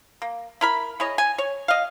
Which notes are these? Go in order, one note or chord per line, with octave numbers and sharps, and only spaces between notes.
A#3
E4 A#4 B5
E4 G#4 C#5 D#5
G#5
C#5
D#5 F5